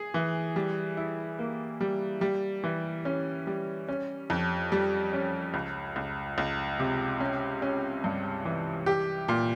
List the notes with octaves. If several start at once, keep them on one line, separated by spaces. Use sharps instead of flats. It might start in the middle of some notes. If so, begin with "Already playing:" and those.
Already playing: G#4
E3
G3
E4
A#3
G3
G3
E3
C#4
G3
C#4
F2
G3
C#4
C#2
C#2
C#2
C3
C#4
C#4
G2
E3
G4
A#2